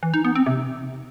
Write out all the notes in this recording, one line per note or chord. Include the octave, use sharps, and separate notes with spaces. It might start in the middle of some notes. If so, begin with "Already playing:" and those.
E3
D#4
B3
C4
C3